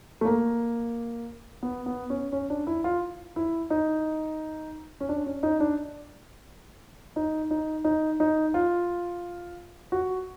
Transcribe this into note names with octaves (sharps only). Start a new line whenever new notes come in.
A3
A#3
B3
B3
C#4
C#4
D4
E4
F4
E4
D#4
C#4
D4
C#4
D#4
D4
D#4
D#4
D#4
D#4
F4
F#4